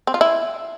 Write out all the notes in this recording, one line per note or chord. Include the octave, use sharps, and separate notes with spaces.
C4
F4
E4